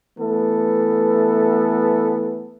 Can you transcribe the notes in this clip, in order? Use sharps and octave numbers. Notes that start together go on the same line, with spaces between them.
E3 A3 B3 A4